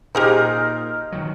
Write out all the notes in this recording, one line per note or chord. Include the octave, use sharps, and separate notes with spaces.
A#2 D#4 G4 G#4 A#4 C5 F5
D#3 F#3